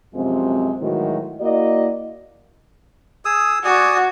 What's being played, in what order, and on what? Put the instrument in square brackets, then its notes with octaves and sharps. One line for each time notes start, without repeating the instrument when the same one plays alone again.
[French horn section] F#2 C3 F3 G#3 C4
A2 D#3 E3 F#3 G#3 F#4
A#3 E4 F#4 D5 D#5
[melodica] G#4 D#6 E6
[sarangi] F#4 [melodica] D5 G#5 D#6